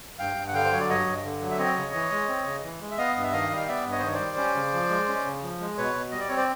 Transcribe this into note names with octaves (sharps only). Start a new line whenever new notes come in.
G2 F5 G5
G2
F#5
D3 F5 G5
C5
F#3 C#5
D5
G2 C#5 D#5
G2
D3
F#3
E5
C4 C#5 D#5
C#3
E3
G#3
C4
C#3
E3
G#3
E5
B3 D#5 F5
G2
E5
D#3 D#5 F5
G3
F5
B3 D5 E5
G2
C#5 D#5
C5
D#3 C#5
C5 D5
G3
C#4
C#3
F3
G#3
C#4
C#3
F3
G#3
B2 B4 C#5
B2
G3 D#5
D5
C4 C#5
C5 D5